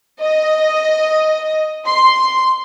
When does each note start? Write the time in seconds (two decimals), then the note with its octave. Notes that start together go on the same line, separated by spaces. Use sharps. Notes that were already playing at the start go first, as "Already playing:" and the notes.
0.20 D#5
1.86 C6